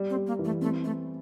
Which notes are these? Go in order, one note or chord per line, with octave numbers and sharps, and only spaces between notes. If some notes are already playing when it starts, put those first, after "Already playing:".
Already playing: G3
C4
G3
A#3
E3
A3
A3 C4
A3 E4